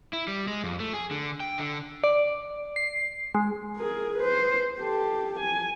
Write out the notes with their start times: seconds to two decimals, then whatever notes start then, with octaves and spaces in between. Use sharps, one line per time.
0.13 E4
0.28 G3
0.48 G#3
0.64 F2
0.80 A3
0.93 G#4
1.11 D3
1.40 G5
1.58 D3
2.04 D5
2.76 C7
3.35 G#3
3.77 G#4 A#4
4.17 B4 C5
4.79 G4 A4
5.39 G#5